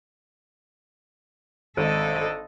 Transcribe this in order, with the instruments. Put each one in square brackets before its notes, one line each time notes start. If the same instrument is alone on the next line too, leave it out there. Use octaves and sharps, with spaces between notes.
[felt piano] G#1 [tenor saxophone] D3 [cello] A4 D#5